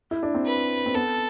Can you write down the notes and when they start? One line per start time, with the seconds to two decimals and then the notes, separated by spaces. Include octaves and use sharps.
0.11 E4
0.23 D4
0.35 C4
0.46 B4
0.86 C4
0.94 B3 A4